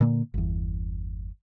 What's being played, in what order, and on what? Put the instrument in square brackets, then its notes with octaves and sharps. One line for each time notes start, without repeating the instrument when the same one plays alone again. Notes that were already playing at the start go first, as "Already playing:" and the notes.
[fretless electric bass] A#2 D3 A#3
G1 E2